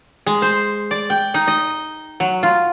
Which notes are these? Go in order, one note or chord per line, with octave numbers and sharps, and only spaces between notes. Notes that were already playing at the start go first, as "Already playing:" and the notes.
G#3
C5
D5
G5
D#4
D#5
F#3
F4